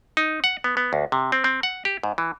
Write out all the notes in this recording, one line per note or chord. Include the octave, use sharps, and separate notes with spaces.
D#4
F#5
B3
B3
D2
C3
C4
C4
F#5
G4
G#2
E3